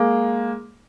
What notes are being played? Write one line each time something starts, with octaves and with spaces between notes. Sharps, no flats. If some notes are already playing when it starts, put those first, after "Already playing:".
Already playing: G#3 A#3